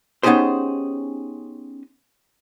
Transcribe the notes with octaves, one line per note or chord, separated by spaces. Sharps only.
B3 C#4 D#4 G4 G#4 C5